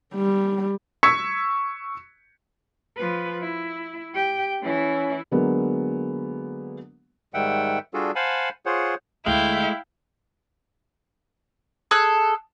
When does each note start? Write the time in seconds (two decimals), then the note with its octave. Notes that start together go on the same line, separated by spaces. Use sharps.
0.14 G3
1.03 C#6 E6 G#6 B6 C#7
2.97 F3 B4
3.41 E4
4.14 G4 G5
4.62 E3 C#4 E4
5.31 D3 F#3 G#3 A#3 B3
7.34 G#2 D#3 G3 E5 F#5 G5
7.94 G3 D4 F4 F#4 G#4 A4
8.15 C5 F5 F#5 G#5 A5 B5
8.66 F4 G#4 C5 C#5 F#5
9.26 D2 G#3 A3 E4 F5 G5
11.91 G#4 A4 F#6